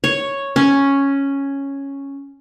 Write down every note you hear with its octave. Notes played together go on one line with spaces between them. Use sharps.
C#5
C#4